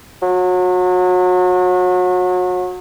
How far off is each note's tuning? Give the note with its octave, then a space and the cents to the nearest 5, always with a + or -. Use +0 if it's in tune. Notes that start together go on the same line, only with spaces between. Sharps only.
F#3 -30